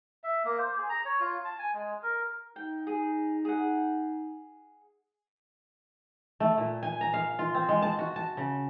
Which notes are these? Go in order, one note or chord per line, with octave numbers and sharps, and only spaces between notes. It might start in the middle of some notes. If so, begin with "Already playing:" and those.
E5
A#3
C5
G#4
A#5
C#5
F4
A5
G#5
G#3
A#4
D#4 G5
G#4
G#4 F#5
A3
A#2
G#5
A#5
F5
F4
C4
G#3
A5
F#4
A5
C#3